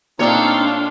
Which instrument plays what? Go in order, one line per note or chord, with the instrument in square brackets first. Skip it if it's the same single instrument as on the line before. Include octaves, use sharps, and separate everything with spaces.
[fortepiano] A#2 [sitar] A3 C#5 [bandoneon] C4 D#4 [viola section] D4 F4 F5